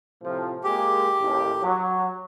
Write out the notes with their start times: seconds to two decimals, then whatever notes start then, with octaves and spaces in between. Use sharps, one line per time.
0.23 A2 C3 F3
0.64 G#3 A#3 G4 G#4
1.20 A1 D#2
1.61 F#3